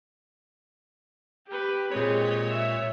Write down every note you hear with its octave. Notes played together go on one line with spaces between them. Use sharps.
G4 B4
A#2 G#3 C4 C#5
E5